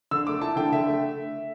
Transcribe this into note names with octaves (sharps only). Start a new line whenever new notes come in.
D3 E6
A3 D6
E4 A5
D3 G5
D3 E5
A3